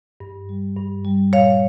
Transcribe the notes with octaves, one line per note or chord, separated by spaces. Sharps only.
G2
G3
G2
G3
A#2 C#5 F5